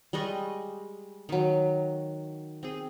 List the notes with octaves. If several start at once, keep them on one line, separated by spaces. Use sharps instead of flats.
G3 G#3 D#5 C#6
D#3 F#3
C4 G#4